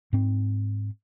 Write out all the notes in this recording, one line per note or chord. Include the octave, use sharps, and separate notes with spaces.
G#2 C4